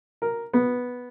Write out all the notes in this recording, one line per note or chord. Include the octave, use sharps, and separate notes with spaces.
A#4
B3